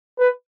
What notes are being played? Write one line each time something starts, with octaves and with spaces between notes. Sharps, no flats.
B4